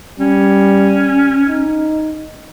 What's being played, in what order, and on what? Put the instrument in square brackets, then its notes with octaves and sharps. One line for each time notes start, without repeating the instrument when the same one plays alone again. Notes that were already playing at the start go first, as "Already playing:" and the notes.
[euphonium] G3 [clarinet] C#4
[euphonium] D#4